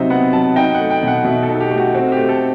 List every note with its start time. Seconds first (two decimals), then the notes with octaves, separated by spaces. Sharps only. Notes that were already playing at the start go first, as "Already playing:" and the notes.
Already playing: C3 F#3 D#4 C5 E5
0.10 B3 F#5
0.33 F#3 A5
0.56 D#4 G5
0.74 F#5
0.80 A3
0.90 G5
1.03 B2 F#5
1.25 B2 E5
1.43 A4
1.49 D#4
1.55 A4
1.60 G4
1.71 A3
1.78 F#4
1.94 C4 F#4
2.12 G4
2.17 A3
2.29 A4